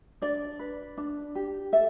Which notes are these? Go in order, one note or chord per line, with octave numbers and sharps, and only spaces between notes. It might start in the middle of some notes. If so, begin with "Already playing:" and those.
D4 D5
B4
D4
G4
A4 E5